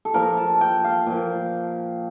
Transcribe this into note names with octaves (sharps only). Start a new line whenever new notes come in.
A4
A#2 F3 A#4
A5
G5
F5
A#2 F3